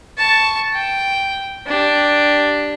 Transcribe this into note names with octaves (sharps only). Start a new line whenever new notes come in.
A5 C#6
G5
D4 G4